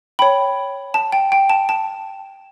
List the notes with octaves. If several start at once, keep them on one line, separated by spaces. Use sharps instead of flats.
C#5 G5 B5
A5
G5
G5
A5
A5